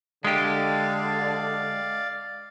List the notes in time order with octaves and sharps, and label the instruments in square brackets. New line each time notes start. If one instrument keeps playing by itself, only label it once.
[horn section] D3 [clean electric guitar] G#3 G4 [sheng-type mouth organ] D5 F5